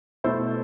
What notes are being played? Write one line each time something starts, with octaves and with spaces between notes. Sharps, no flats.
B2 A3 E4 A4 C5